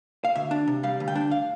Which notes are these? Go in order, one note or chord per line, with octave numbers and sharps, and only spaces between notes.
F5
D2 E5
D4
C3
G3 F5
D2
G5
D4
F5